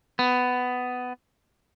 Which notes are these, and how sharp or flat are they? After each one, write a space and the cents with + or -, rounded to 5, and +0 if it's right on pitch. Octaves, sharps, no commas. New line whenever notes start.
B3 +15